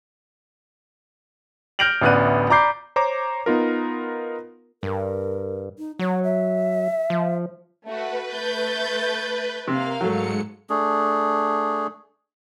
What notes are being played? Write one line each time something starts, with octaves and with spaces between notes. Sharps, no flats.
F6 G6 A#6 D7 F7 F#7
A1 D2 B3 D5 F#6 D#7
D5 A#5 B5 D6 G6 C7
C5 C#5 A#5 D6
B3 D#4 F4 A#4
G2 A#4
D#4
F#3 C#5
E5
F3
A3 F#4 B4
A3 G6 A6
C3 A#3 F5
G#2 F#3 G#3 A3 C#7
A3 D4 G#4